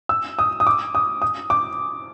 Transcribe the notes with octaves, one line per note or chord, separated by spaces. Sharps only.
E6
D#6
D#6
D6
D#6
D#6
D6